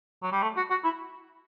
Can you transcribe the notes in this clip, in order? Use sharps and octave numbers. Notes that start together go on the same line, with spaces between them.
F#3
G3
A3
F#4
F#4
E4